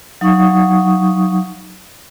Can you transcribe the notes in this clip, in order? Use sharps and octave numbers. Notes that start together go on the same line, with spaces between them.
F#3 D#4 F5 F#5 C#6 D#6